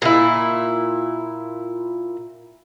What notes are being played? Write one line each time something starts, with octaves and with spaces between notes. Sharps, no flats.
A#2 E4